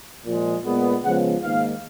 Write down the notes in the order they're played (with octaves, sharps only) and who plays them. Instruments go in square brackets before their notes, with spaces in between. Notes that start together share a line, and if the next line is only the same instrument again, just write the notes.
[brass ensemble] A#2 F3 G#3
A#2 G#3 B3
C#3 F3 G#3 B3 F#5
G#2 D#3 A#3 F5